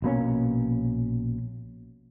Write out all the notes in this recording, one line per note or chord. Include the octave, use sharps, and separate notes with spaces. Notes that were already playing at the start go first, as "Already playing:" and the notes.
A#1 B2 A#3 C#4